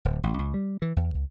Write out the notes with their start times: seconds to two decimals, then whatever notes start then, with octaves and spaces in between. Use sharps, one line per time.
0.05 D1
0.23 A1
0.39 C#2
0.54 G3
0.82 E3
0.96 E2
1.14 C#2